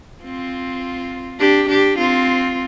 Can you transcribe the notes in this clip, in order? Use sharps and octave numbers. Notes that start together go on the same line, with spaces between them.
C4 F4
D4 G4
D4 G4
C4 F4